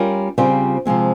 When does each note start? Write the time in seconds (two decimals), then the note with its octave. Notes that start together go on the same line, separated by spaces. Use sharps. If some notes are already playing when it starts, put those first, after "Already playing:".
Already playing: G3 C#4 F4 A#4
0.38 C#3 G3 C4 F4 C5
0.85 C3 F3 G#3 C4